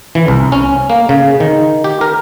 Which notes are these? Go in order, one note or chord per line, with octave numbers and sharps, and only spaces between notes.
E3
C2
C#4
A#3
C#3
D#3
G4
A#4